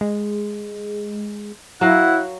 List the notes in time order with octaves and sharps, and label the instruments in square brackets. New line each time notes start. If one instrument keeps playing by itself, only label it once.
[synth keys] G#3
[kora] F#3 A#4 F5 [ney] E4 [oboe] F#5